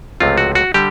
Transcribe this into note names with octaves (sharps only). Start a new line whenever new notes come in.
C#2 C3 F3 A3 C4 F4
F#4
F#4
D3 G3 G4